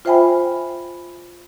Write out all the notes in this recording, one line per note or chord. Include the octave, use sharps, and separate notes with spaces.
F4 C5 E5 G5 G#5 B5